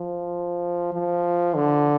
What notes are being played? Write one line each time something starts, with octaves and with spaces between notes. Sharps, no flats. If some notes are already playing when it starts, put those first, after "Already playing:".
Already playing: F3
F3
D3